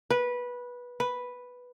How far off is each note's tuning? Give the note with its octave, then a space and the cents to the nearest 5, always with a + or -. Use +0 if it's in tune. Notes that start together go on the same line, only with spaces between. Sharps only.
B4 -15
B4 +0